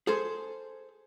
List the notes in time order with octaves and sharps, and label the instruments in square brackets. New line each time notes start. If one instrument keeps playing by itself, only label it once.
[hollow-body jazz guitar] G#4 A4 C5